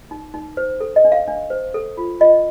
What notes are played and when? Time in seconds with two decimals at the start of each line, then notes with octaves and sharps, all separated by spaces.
0.11 D#4
0.34 D#4
0.57 C5
0.80 A4
0.96 D#5
1.05 D4
1.12 F5
1.28 D4
1.50 C5
1.74 A4
1.97 F4
2.20 F4 D#5